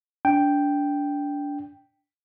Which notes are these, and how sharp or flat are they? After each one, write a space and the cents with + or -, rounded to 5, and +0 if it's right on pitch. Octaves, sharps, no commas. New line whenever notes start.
D4 -25 G5 +0